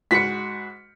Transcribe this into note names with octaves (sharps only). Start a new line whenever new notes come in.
G#2 F#4 B5 B6 C#7